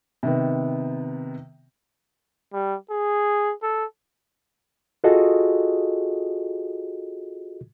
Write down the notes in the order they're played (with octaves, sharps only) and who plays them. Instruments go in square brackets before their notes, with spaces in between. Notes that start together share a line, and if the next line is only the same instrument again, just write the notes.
[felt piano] C3 D#3 B3
[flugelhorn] G3
G#4
A4
[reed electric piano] F4 F#4 G#4 A4 D#5